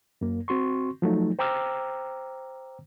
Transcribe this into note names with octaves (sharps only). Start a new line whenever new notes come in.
F#2 A#3
C4 F#4 C6 C#6
F3 F#3 A3 D#4
C5 G5 A#5 D6 E6 F6